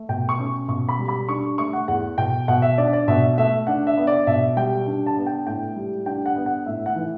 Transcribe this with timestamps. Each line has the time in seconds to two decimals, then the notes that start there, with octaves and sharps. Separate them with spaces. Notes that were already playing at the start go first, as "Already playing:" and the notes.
Already playing: A3
0.09 B2 G5
0.29 C#6
0.39 C#4
0.68 B2 C#6
0.89 B5
0.99 G3
1.08 B5
1.29 D4 C#6
1.58 A3 C#6
1.73 F#5
1.88 E2 F#5
2.18 B2 G5
2.48 B2 F#5
2.62 E5
2.78 D4 D5
2.93 D5
3.08 B2 E5
3.38 A3 E5
3.67 D4 F#5
3.87 E5
3.97 B3
4.07 D5
4.27 B2 E5
4.57 G3 G5
4.87 D4
5.06 A5
5.17 B3
5.26 G5
5.46 A2 G5
5.76 G3
6.06 D4 G5
6.26 F#5
6.36 B3
6.46 F#5
6.66 A2 E5
6.86 F#5
6.96 E3